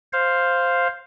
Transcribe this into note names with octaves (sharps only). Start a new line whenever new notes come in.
C5 F5